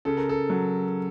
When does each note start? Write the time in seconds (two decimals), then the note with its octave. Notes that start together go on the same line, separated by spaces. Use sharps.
0.05 C#3 A4
0.17 A#4
0.29 A4
0.50 F#3